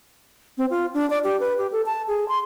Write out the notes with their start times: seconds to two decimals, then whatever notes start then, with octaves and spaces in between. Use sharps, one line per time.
0.58 C4
0.70 F4
0.94 D4
1.10 D5
1.24 G4
1.40 B4
1.58 G4
1.72 A4
1.86 A5
2.08 G#4
2.28 C6